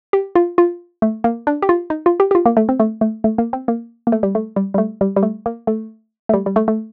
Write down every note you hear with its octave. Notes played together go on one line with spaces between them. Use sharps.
G4
F4
F4
A3
A#3
D4
G4
F4
D#4
F4
G4
G4
F4
A#3
A3
C4
A3
A3
A3
A#3
C4
A#3
A#3
A3
G3
A3
G3
G3
A3
G3
G3
A3
A#3
A3
A3
G3
G3
A3
A3